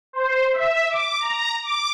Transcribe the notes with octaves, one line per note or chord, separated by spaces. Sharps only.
C5
E5
D6
A#5
D6